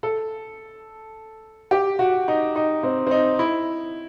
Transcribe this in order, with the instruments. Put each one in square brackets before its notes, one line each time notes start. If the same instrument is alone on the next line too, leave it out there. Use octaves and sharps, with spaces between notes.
[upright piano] A4
G4
F#4
D#4
D#4
C4
C4
D#4
E4